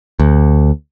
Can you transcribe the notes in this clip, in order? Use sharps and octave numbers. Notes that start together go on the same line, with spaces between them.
D2